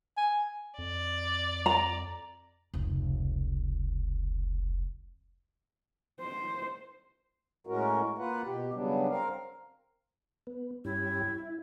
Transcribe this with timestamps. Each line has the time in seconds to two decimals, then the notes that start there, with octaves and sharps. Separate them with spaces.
0.17 G#5
0.78 F2 D5
1.66 A#5
2.74 F1 C#2
6.21 C5
7.67 A2 G#3 C#4 F#4 A#4
8.18 A#3 F4 B4 F#5
8.45 B2 G4
8.74 C#3 F#3 G3 B3 D4
9.09 C4 A#4 F5
10.47 B3
10.85 G2 C#4 E4 G4
11.39 E4